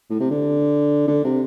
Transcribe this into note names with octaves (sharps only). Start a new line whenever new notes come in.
A2
C3
D3
D3
C3